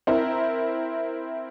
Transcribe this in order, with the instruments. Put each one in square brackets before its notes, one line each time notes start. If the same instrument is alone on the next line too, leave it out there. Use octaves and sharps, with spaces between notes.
[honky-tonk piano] C4 E4 A#4 A#5